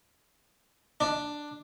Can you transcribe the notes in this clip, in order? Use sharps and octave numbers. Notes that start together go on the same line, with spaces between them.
D4